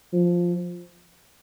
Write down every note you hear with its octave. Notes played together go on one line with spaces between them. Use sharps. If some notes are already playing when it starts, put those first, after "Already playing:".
F3